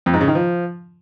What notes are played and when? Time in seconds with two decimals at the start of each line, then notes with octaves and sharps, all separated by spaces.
0.06 F2
0.13 G#2
0.21 C#3
0.28 D#3
0.35 F3